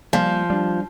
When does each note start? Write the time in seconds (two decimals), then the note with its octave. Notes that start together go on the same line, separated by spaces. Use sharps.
0.13 F3 G3 A#3
0.50 G3 D4